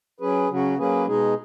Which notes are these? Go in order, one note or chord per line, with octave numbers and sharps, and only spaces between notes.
F#3 C#4 G#4 B4
C#3 F#3 C#4 F#4
F#3 A#3 C#4 G#4 B4
B2 G#3 D#4 G#4